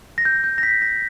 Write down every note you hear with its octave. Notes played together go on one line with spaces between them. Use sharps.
A#6
G6
G6
A#6
B6
A#6